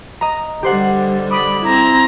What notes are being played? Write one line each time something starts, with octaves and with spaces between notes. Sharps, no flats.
D#5 A#5
D3 G3 G4 C5 F#5
B5 D6 D#6 D7
C4 E4 A#5